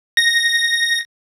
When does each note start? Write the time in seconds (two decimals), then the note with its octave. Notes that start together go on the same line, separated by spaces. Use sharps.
0.17 A#6